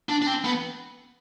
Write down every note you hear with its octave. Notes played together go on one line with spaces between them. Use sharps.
D4
D4
C4
B3